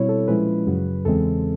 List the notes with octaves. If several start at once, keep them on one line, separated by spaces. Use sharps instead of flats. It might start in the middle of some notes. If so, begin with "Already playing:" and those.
Already playing: B2 G3 C4 E4 C#5
A4
A#2 F3 G#3 C#4 E4 B4
F#2 C#3 F#3
E2 C#3 E3 G#3 C4 A4